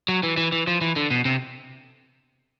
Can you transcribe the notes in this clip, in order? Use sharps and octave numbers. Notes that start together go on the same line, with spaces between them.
F#3
E3
E3
E3
F3
E3
D3
B2
C3